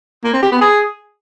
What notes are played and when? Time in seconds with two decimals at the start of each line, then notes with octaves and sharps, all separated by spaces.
0.24 A#3
0.33 C4
0.42 G4
0.52 B3
0.61 G#4